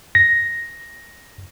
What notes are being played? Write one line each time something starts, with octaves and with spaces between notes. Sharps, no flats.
A#6